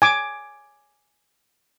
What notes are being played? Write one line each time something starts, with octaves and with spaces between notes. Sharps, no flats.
G#5 D6